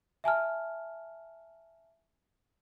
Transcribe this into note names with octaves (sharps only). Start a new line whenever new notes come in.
E5 G#5 A5 F6